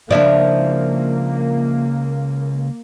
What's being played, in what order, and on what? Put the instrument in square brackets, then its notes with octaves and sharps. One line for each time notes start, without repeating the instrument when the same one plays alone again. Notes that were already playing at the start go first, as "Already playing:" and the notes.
[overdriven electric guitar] C#2 G2 [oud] F3 E4 [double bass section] A#3 [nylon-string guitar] D4 D5